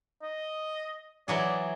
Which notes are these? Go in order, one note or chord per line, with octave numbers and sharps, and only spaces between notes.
D#5
E3 F#3 G#4 D5